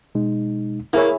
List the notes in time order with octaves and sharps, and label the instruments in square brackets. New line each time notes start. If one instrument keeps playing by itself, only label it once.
[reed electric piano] B2 G#3 D#4
[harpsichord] A#3 [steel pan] E4 G#4 C#5